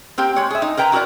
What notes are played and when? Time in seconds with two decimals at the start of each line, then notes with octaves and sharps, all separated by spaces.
0.18 A#3 C4 G4 G5
0.36 G#3 C#5
0.50 G#4 E5
0.62 D#4
0.77 A#4 B4 G5 A#5
0.92 E4 F#4 A4 A#4 D5